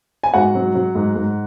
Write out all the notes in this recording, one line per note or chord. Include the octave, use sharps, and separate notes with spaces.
G#5
G#2 F#4 F#5
F#3
F#3
G#2
G#2